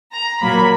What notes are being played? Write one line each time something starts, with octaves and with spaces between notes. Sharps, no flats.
A#5
A#2 F#3 A#3 B5